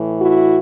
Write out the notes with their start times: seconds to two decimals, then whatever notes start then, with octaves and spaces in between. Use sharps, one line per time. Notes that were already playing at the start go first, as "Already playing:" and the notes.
Already playing: A2 E3
0.20 E4 F#4